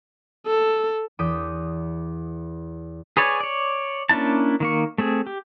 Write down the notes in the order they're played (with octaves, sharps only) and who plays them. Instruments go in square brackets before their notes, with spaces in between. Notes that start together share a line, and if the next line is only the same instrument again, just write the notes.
[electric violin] A4
[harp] E2 D6 D#6 G6 B6 D#7
[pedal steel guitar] G#4 B4 C#5 D5 G#5
C#5 D5
A#3 C#4 D4 E4 A5
D#3 A#3 C#6
A3 C4 G#4
G4